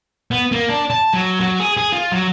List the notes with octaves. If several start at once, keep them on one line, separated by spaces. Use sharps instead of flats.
B3
A#3
D4
A5
F#3
F#3
G#4
G#4
F4
F#3